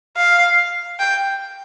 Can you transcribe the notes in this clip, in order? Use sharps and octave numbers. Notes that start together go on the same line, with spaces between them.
F5
G5